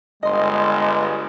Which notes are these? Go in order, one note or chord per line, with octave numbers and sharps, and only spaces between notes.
G1 G#3 D#5 C6